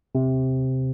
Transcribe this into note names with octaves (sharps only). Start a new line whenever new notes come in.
C3